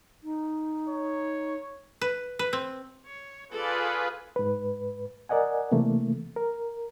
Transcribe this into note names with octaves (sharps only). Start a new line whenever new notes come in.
D#4
C#5
B4
B4
C4
C#5
F4 G#4 A4 B4 D5
G#2 B4
A#4 D5 D#5 F#5 G#5
C3 E3 A3 A#3
A#4